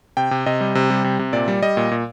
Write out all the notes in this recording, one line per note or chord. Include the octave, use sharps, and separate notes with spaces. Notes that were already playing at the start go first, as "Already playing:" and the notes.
C3 G5
C3
C3 D#5
G3
C3
G3
C3
C3
A#2 D5
G3
G3 D#5
A#2
A#2